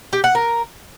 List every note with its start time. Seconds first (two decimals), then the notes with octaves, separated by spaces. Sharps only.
0.13 G4
0.24 F#5
0.35 A#4